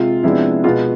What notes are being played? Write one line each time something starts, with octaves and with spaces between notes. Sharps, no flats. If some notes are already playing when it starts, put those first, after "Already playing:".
Already playing: C3 G#3 F4
C3 F3 G#3 B3 D4 E4
B2 G#3 B3 F4